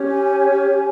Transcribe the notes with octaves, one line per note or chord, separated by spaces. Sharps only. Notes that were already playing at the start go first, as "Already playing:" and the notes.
Already playing: C#4 G4 C#5
G#5
G#5
G#5